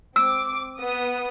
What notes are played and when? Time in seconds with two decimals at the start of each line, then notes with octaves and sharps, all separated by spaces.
0.16 C4 D6 E6
0.79 B3 D#6